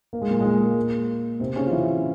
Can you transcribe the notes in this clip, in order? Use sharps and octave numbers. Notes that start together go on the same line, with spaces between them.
A#3
G#3
A#2 A#3
G#3
A#2 A#3
C3 C4
C#3 C#4
F4
E3 E4